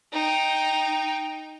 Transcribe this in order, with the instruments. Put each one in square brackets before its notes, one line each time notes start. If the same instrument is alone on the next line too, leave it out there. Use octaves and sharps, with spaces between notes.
[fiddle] D#4 G5